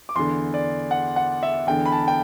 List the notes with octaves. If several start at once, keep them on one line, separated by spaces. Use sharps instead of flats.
D6
E2 D3 C6
D5
F#5
F#5
E5
E2 D3 G5
B5
A5
G5